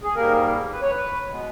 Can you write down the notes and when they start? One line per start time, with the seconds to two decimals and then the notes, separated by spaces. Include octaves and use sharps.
0.03 G#4
0.15 G#2 G3 A#3 A#4
0.72 B4
0.82 C#5
0.90 B4
1.28 B2 G#3 B3